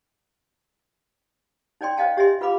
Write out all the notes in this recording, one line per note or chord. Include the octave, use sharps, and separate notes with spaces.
D#4 C#5 D5 G5 C6
C5 C#5 D#5 F5 G5 A5
G4 C#5 D#5 E5 G#5 C6
F4 B4 F5 B5 D6